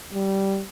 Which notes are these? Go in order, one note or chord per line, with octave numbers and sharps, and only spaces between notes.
G3